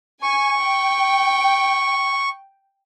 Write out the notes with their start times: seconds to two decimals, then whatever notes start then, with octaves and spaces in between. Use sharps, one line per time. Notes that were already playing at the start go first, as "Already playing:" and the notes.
0.23 G#5 C#6
0.61 G5